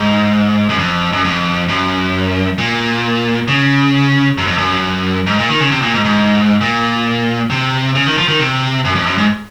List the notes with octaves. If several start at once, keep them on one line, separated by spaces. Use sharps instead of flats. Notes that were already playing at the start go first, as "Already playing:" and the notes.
Already playing: G#2
F#2
F2
F#2
F2
F#2
A#2
C#3
F#2
F2
F#2
G#2
A#2
D#3
C#3
C3
A#2
G#2
G#2
A#2
C3
C#3
D#3
F3
D#3
C3
F#2
F2
F#2
G#2